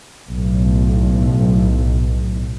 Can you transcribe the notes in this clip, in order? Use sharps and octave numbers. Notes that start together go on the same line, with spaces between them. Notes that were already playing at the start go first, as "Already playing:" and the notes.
B1 A2